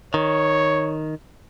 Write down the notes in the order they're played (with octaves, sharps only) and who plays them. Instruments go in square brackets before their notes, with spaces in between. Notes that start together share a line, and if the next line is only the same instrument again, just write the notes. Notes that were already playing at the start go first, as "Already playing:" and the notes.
[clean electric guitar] D#3 [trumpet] C#5